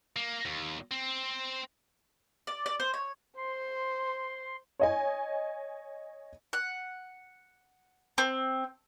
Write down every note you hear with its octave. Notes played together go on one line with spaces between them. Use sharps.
A#3
D#2
C4
D5
D5
C5
C#5
C5 C6
C#5 D#5 G#5
F#5
C4